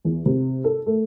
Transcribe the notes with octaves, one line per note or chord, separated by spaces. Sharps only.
E2
C3
A4
A3